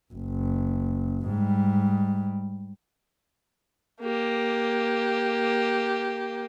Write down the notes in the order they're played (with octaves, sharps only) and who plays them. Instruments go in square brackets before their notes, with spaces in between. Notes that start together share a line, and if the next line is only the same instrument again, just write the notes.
[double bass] F#1
G#2 G3
[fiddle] A#3 G4